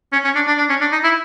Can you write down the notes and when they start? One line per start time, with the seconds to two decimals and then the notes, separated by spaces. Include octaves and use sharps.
0.13 C#4
0.24 C#4
0.35 D4
0.47 D4
0.58 D4
0.69 C#4
0.81 D4
0.92 D#4
1.04 E4